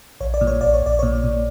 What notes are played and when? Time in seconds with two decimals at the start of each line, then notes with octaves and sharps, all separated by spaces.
0.21 A#1 C#5
0.34 D5
0.41 A#2
0.47 C#5
0.61 A#1 D5
0.74 C#5
0.82 A#1 D5
0.99 A#2 C#5
1.24 A#2